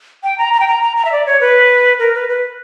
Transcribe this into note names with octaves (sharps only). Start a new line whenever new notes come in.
G5
A#5
A#5
G5
A#5
A#5
A#5
E5
D5
C#5
B4
A#4
B4
B4